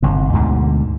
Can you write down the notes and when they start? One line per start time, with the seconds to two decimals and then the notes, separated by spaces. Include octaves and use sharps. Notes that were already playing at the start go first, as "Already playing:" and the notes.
0.02 G1 C2 G#2
0.33 D2 G#2 B2 D3